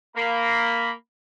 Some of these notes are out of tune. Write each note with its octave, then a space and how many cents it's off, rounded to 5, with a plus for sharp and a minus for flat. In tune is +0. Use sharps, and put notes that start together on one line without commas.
A#3 -5 B5 +0